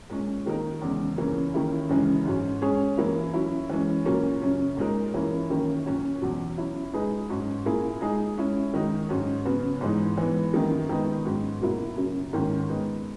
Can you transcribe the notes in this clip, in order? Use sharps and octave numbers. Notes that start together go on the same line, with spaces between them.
A#2 G#3 C#4
D#3 A#3 D#4 A#4
E2 C#3 G#3
C#3 E3 A#3 C#4
D#3 A#3 C#4 E4
F#2 C#3 E3 G#3
G#2 F#3 C#4
G#3 C#4 G#4 C#5
E3 A#3 E4
F#3 C#4 E4
E3 G#3 C#4
A#2 F#3 A#3 C#4
F#2 C#3 F#3 C#4
A#2 G#3 D#4 A#4
E3 A#3 C#4 E4
F#2 D#3 A#3 C#4
A#2 F#3 C#4 F#4 C#5
E2 B2 F#3
F#3 C#4 E4
G#3 D#4 G#4 B4
G#2 F#3 C#4
A#2 A#3 E4 G#4
G#3 D#4 G#4
G#3 C#4 E4
D#3 G#3 D#4 F#4
G#2 F#3 C#4
C#3 F#3 B3 F#4
G#2 E3 G#3 D#4
E3 G#3 B3
F#2 D#3 A#3 D#4
D#3 G#3 B3 D#4
G#2 F#3 C#4
B2 F#3 A#3 E4
F#2 C#3 F#3 A#3
G#2 D#3 A#3 C#4
G#3 B3 D#4